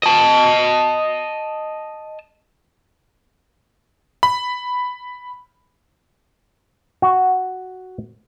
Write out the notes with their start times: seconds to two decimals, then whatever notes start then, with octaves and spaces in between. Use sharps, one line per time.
0.03 D#5 A5
4.23 B5
7.02 F#4